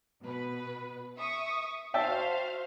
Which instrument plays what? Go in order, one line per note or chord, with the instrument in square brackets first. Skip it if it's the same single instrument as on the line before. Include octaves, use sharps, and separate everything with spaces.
[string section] B2 B4
E5 C#6 D#6
[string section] F#4 C5 F5 [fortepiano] E5 G5 A5